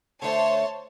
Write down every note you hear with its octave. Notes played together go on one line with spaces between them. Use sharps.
D3 A3 C5 C#5 A5